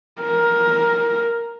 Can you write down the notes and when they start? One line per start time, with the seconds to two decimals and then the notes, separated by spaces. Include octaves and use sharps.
0.21 A#4